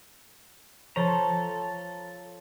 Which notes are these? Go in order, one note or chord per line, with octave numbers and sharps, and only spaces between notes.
F3 A4 C5 C#5 A#5